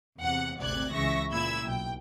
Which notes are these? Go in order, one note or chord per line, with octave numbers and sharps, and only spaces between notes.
E2 C3 F#5
G#1 D2 C3 D5 F#6 G#6
C#2 C#3 E3 E5 C#6 A#6
A#2 E4 B5 E6 G#6
B1 G5